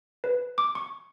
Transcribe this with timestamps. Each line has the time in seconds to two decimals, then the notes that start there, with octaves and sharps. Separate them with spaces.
0.24 B4
0.58 D6
0.75 C#6